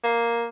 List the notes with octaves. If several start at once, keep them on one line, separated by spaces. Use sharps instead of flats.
A#3